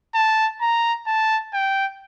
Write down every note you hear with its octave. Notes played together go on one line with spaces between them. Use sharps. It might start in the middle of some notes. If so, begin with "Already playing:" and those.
A5
A#5
A5
G5